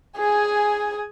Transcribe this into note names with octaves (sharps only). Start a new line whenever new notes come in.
G#4 G#5